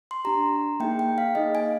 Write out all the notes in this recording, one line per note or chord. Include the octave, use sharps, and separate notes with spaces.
C6
D4 G4 A#5
A#3 D#4 G#4 G5
G5
F5
A#3 D#4 G#4 D#5
G#5